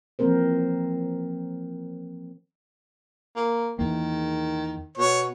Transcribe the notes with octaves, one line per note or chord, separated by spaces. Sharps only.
E3 F3 A#3 C4 A#4 C5
A#3
E2 D#3 A#3
B2 C#5